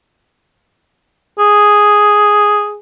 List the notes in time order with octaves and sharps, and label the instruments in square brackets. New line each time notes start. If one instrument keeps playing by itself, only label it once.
[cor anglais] G#4